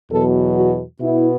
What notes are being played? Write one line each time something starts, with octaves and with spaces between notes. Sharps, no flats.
E2 B2 F#3 A4
F#4
B2 B3 E4